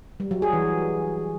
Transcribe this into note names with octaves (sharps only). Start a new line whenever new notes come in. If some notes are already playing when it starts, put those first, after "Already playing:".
G3
F#3
G#4
E3